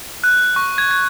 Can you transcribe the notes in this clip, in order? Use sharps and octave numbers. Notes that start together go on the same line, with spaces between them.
F#6
C#6
G#6
G#6